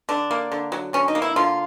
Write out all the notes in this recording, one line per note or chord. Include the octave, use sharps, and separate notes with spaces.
D3 D4
A#3
D3
F#3
D3 C#4
D#4
A#3
E4
D3 F4